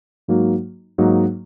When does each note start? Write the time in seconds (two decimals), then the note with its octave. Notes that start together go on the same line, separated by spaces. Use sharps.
0.28 G#2 F#3 A#3 D#4 F#4
0.98 G#2 F#3 A#3 D#4 F#4